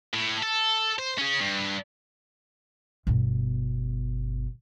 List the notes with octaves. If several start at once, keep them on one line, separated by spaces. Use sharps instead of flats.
A2
A4
C5
C#4 G#4
G2
G1 B2